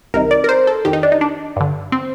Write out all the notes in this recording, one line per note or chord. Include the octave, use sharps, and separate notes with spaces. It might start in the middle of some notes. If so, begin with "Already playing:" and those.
C2 C3 D#3 A#4
D5
A#4
C5
A4
F2 D#3 G4
D#4
D4
D#4
D4
G2 D3
C4